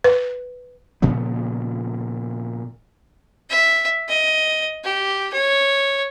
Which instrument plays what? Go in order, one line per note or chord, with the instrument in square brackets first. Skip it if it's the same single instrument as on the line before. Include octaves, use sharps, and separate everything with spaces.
[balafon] B4
[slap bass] A#2 C#3 F3 B3
[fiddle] E5
D#5
G4
C#5